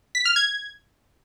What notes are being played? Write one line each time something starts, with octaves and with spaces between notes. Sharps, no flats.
B6
F6
G#6